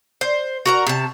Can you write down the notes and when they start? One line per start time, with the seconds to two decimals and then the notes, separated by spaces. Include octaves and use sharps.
0.21 C5
0.66 F#4 A#4 A#5
0.87 C3 A5